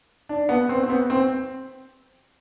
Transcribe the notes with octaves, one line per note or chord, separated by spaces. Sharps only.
D4
B3
C4
C4
B3
C4